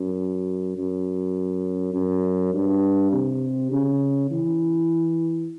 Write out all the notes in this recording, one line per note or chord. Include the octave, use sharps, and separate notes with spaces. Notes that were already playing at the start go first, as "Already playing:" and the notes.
Already playing: F#2
F#2
F#2
G2
C3
C#3
E3